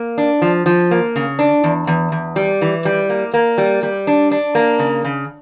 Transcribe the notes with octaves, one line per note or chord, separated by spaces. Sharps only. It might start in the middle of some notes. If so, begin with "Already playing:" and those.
Already playing: A#3
D4
F3
F3
A#3
C#3
D4
E2
E2
E2
G3
E3
G3
A#3
A#3
G3
G3
D4
D4
A#3
C#3
C#3